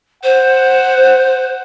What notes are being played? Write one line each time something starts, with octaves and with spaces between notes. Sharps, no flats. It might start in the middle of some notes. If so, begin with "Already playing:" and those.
C5 F#5